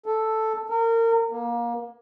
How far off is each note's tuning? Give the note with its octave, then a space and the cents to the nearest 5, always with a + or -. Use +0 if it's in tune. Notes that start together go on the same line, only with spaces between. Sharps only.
A4 +0
A#4 -30
A#3 +25